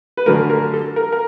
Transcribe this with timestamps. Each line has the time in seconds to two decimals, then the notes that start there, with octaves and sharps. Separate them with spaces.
0.17 B4
0.26 F#2 D3 F#3 A3 A#4
0.50 A#4
0.73 A4
0.96 A#4
1.12 A#4